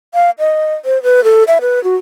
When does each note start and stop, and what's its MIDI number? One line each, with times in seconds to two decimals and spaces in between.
0.14 0.30 77
0.39 0.74 75
0.85 1.02 72
1.03 1.24 71
1.24 1.44 69
1.48 1.58 76
1.61 1.82 71
1.84 1.96 66